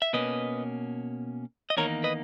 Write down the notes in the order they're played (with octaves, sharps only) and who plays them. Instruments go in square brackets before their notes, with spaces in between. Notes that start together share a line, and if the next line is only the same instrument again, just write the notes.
[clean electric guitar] E5
B2 A#3 C#4 B4 D#5
D#5
E2 D#3 A#3 D#4 A#4 C#5
B4 D#5